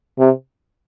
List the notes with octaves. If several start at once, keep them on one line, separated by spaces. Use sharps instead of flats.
C3